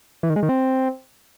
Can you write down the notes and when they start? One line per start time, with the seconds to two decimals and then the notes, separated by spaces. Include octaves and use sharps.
0.23 E3
0.30 D#3
0.36 G#3
0.43 D#3
0.49 C4